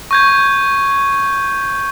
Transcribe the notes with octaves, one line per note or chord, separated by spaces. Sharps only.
C#6 G6 G#6